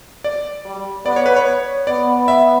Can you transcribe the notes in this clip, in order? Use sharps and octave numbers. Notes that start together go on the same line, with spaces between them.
D5
G3
B3 D5
C#5
B4
C#5
B3 D5
E5